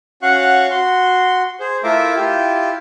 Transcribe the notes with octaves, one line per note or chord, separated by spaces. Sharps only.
C#4 F#4 F5 F#5 C#6 F#6
F#4 C6
G#4 C5
A3 E4 F4 A#4 E5 D6
E4 F4 G4